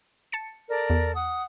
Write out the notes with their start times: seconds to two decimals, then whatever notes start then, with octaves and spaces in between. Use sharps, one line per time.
0.32 A5 A6 C#7
0.68 A4 A#4 D5
0.90 E2
1.14 F#5 D#6